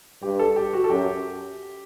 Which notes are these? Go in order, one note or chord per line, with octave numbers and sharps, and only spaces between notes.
G2 G4
A4
G4
F#4
A4
F#2 G4